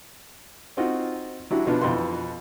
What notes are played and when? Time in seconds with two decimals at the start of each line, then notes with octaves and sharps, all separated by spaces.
0.77 C4 D#4 F4 F#4 D#5
1.51 F#3 D4 E4 G4
1.67 B2 F3 B3 D4 F4
1.82 F2 B2 E3 B4 C6